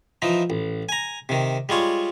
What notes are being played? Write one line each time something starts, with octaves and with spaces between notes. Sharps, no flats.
E3 F3 D#4
A1
G#5 A#5
C3 D#3
G3 G#3 F4 C#5